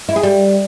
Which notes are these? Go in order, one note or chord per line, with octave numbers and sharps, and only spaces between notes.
E4
G#4
G3